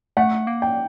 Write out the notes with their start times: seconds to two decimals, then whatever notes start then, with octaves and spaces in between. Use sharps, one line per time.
0.17 A3 F#5
0.47 A#3
0.62 G5